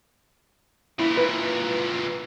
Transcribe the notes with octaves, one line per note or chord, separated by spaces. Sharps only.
A#2 E3 E4
B4